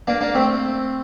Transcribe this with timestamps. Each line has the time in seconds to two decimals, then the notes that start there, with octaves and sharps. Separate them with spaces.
0.07 A#3 D4
0.21 A#3 D4
0.35 A3 C4